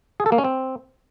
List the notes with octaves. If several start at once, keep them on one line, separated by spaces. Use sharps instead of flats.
G#4
A4
A#3
C#4
C4